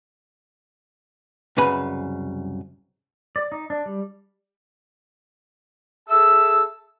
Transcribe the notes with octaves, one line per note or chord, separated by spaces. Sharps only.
C2 F#2 C#3 B4 G#5
D5
D#4
D4
G3
G#4 A4 E5 A5 E6